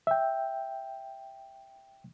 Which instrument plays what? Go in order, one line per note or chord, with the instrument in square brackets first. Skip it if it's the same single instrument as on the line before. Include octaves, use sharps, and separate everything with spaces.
[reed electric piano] E5 G5